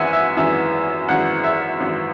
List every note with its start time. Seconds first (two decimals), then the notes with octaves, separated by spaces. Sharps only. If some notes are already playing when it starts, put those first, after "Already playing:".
Already playing: G#1 F#2 E3 E5 F#5 G#5
0.13 E5
0.37 G#1 F#2 E3 E5
1.08 G#1 F#2 E3 F#5
1.44 E5
1.80 G#1 F#2 E3